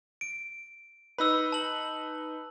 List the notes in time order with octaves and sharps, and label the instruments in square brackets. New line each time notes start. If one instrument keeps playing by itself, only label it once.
[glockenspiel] D7
[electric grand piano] D#4 B4 [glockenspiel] B5 E6
[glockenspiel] A5 F#7